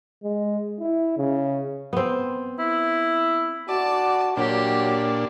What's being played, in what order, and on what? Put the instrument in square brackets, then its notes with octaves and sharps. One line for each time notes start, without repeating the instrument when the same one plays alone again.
[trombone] G#3
E4
C#3
[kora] B3 C4
[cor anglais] E4
[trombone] F#4 [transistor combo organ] D5 [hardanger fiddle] A5
[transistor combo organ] A#2 D4 [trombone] F#3 [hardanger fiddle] G4